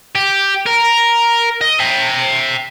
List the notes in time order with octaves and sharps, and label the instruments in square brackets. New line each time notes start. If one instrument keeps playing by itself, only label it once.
[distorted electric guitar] G4
A#4
D#5
E5 G5